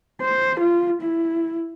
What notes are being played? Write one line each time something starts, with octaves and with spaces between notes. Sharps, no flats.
C5
F4
E4